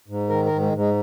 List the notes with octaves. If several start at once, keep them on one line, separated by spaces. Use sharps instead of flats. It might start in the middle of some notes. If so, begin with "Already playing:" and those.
G#2
D#3 A#4
A#4
G#2
G#3
G#2
G#3